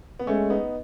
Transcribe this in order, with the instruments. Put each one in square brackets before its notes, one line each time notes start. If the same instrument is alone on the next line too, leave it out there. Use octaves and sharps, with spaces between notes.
[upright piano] B3
[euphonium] G#3 [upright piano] A3 C#4
[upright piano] B3 D#4